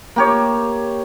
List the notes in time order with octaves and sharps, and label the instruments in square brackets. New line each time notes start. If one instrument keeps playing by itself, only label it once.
[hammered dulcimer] A#3 G4 C#5